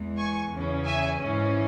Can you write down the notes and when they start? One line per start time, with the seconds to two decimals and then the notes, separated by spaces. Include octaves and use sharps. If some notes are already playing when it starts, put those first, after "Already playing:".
Already playing: E2 E3 G#3
0.17 G#5 C#6
0.52 E2 C#3 E3 C#4
0.84 E5 G#5
1.19 G#2 E3 C#4